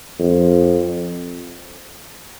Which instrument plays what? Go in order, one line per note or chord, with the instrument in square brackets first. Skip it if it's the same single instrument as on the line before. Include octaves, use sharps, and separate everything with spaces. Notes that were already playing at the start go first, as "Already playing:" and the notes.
[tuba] F2